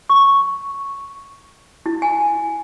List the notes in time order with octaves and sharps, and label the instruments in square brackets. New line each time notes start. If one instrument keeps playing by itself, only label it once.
[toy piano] C#6
E4
G#5